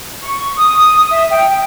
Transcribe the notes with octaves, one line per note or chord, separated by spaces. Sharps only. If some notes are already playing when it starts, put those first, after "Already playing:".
C#6
D#6
E5
G5